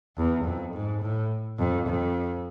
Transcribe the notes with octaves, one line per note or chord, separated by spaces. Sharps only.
E2
F2
G#2
A2
F2
F2